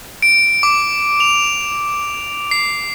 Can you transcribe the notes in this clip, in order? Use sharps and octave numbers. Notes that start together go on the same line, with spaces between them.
D7
D6
F7
C7